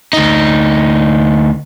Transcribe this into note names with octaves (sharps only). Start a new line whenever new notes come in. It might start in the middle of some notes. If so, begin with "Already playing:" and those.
D2 D#4